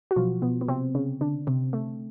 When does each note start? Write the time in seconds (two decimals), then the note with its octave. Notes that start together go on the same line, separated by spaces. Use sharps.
0.11 F#4
0.16 B2 F3 F#3 F4
0.42 B2 B3
0.61 B3
0.68 C3 C4
0.95 C#3 C#4
1.21 D3 D4
1.47 C3 C4
1.73 A3